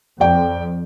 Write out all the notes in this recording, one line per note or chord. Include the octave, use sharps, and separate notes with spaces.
F2 D5 G5